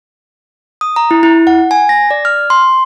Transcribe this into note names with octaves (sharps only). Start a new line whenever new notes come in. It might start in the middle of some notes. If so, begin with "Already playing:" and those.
D#6
A#5
E4
E4
F#5
G#5
A#6
D5
F6
C6